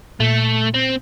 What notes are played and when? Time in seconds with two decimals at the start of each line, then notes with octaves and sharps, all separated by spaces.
0.20 A#2 A3
0.74 C4